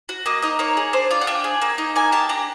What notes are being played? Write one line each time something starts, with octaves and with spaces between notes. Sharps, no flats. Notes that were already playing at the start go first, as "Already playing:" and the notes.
F#4
A#3 D#5
D#4 D#5
A#3 C#5
G#4
D4 C5
F4 D5
F#5
D4 G5
G#4
A#3
D#4
A#3 G#5
G4 A5
D4 A#5